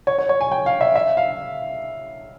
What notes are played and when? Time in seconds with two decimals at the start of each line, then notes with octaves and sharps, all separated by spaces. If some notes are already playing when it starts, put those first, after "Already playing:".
0.07 C#5
0.19 C#5
0.29 C#5
0.41 G#5
0.52 G5
0.66 F5
0.81 E5
0.96 E5
1.17 F5